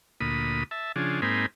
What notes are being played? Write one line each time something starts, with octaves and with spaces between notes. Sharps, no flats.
D2 A#2 B5 D#6
E5 A5
C#3 F3 D4 G#4
G#2 A#3 C4 D#4 G#5 B5